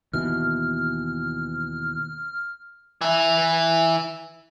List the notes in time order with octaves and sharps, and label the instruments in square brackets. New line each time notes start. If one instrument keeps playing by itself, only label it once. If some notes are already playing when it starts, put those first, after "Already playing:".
[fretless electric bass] D#2 B2 E3 [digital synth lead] F6
[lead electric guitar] E3 E4